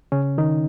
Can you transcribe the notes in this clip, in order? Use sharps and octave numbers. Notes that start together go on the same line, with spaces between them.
C#3 C#4
D#3 D#4